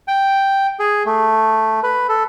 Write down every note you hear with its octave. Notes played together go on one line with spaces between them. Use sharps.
G5
G#4
A3
B4
A4